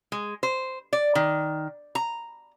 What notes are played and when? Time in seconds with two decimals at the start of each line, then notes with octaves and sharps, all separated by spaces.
0.12 G#3
0.43 C5
0.93 D5
1.15 D#3
1.95 A#5